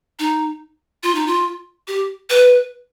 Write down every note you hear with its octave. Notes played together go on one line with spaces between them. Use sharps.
D#4
F4
D#4
F4
G4
B4